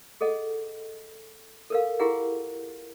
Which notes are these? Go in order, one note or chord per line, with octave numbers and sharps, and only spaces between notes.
G#4 A4 D#5 F#5
A4 A#4 F5
E4 F4 G4 G#4 A#4 F#5